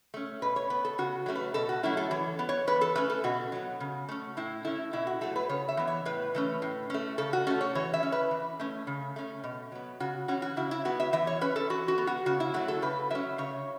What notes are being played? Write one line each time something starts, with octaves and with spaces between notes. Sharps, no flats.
A3 C#4
B2 B4
C#5
B3 B4
A4
C#3 F#4
F#3 A3 C#4
B4
B2 A4
F#4
F#3 A3 C#4 E4
A4
E3 C#5
B3
C#5
E3 B4
A4
A3 C#4 B4
A4
B2 F#4
F#3 B3
C#3
A3 C#4
A2 E4
A3 C#4 E4
B2 E4
F#4
F#3 A3 A4
B4
C#3 C#5
E5
E3 B3
C#5
A2 B4
E3 A3 C#4
A2
A3 C#4
C#3 A4
F#4
A3 C#4 A4
C#5
E3 C#5
E5
C#4
B4
E3
A3 C#4
C#3
A3 C#4
B2
F#3 B3
C#3 F#4
E3 C#4 F#4
F#4
C#3 E4
E4
F#3 B3 F#4
E5
E3 E5
C#5
C#4 B4
A4
E3 F#4
F#4
B3
F#4
C#3 F#4
E4
F#3 A3 F#4
A4
C#3 B4
F#3 C#4 E5
C#3 C#5